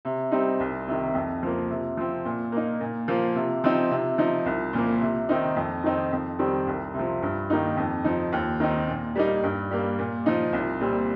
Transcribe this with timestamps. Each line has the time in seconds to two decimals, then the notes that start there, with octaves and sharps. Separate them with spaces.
0.05 C3
0.31 G3 C4 D#4
0.60 C2
0.88 C3 D#3
1.15 F2
1.43 F3 A#3
1.70 C3
1.97 F3 C4
2.25 A#2
2.52 A#3 D#4
2.81 A#2
3.08 F3 A#3
3.35 C3
3.64 F3 C4 D#4
3.91 C3
4.18 F3 D#4
4.46 C2
4.73 A#2 F3 A#3
5.01 C3
5.29 D#3 C4 D#4
5.56 F2
5.84 D#3 C4 D#4
6.12 F2
6.39 D#3 G3 C4
6.67 C2
6.94 C3 F3
7.23 G2
7.50 D#3 A#3 D#4
7.77 F2
8.04 F3 D#4
8.32 D#2
8.60 D#3 C4 D#4
8.88 A#2
9.15 G3 A#3 D#4
9.43 G2
9.71 G3 A#3
9.99 A#2
10.26 F3 D#4
10.53 C2
10.81 A#2 G3 C4